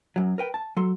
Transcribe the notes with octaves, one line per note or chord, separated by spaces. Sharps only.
F#2 F#3
A#4 B4 G5
A5
F#3 A4 C6